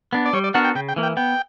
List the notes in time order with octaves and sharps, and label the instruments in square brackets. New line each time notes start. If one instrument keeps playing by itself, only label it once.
[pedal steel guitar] B3 D4
[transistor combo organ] D5
[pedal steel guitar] G3 [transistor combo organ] C#5
[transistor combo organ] D5
[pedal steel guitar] B3 D4 F#4 A#4 [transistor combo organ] F#5
[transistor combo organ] G5
[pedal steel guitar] C#3 [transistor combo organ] G5
[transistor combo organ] G5
[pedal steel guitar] E3 A#3
[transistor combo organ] G5
[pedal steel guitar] B3 [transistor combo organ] G5